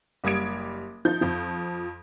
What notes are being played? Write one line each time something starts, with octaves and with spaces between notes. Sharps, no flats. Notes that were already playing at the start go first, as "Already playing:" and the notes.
F#1 G3 D#6 G#6 D7
F3 D#4 G6
F2 F3